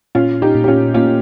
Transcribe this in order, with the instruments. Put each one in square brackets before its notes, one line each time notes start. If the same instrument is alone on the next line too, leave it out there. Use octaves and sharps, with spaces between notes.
[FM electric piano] A#2 [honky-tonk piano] C#4 F4
[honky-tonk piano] D#4 G4
[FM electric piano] A#2
[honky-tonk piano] G4
C#4 F4
[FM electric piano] A#3 [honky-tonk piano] C#4 F4